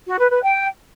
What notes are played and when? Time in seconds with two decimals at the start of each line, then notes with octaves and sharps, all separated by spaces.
0.08 F#4
0.19 B4
0.31 B4
0.43 G5